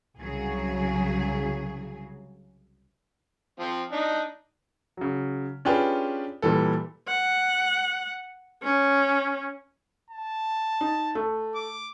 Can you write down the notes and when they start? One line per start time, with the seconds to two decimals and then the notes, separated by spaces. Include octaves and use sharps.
0.17 C2 C#3 F#3 G#4
3.60 F3 C4
3.92 D4 D#4
4.97 C#3 F#3
5.65 C#4 D4 F4 G4 G#4 B4
6.42 A#2 E3 G3 A4
7.08 F#5
8.63 C#4
10.10 A5
10.81 D#4
11.15 A3
11.55 D6